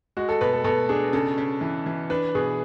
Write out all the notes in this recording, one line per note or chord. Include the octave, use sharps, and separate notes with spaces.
G#3 F#4
A4
B2 B4
A4
B2 A4
D4 G#4
C#3 A4
C#3
E3
E3
D4 B4
B2 G#4